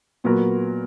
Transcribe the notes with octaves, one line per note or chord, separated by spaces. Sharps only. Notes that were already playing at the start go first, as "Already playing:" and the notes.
A#2 F#3 B3 F#4 A#4